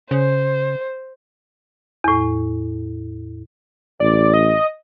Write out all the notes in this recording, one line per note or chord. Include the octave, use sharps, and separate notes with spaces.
C#3 C5
E2 A2
A1 D5
D#5